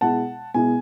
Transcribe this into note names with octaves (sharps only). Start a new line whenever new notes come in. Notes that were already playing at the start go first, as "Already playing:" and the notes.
B2 G#3 B3 E4 F#5 A5
B2 G#3 B3 E4 G#5